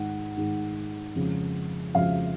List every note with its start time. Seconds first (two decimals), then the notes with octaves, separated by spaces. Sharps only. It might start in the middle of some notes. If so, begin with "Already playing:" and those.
Already playing: G#2 D#3 G#3 F#5
0.37 G#2 D#3 G#3
1.16 F2 C#3 F3 G#3
1.95 F2 C#3 F3 G#3 F5